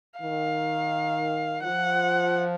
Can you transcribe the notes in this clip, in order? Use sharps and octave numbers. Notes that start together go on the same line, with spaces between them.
D#3 F5
F3 F#5